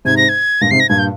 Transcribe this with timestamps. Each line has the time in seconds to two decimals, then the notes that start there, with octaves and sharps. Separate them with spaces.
0.05 G#2 C3 G#6
0.17 A#6
0.29 G#6
0.61 G2 A#2 A#6
0.71 G#2 C3 C7
0.80 A#6
0.89 G2 A#2 G#6
0.99 G6